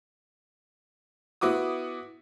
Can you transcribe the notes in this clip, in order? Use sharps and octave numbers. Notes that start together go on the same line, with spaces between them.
B3 E4 F#4 D6 D#6